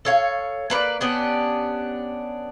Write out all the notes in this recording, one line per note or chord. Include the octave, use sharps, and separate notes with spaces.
A4 C#5 F5
A#3 B4 C#5 D5
B3 C#4 D4 G4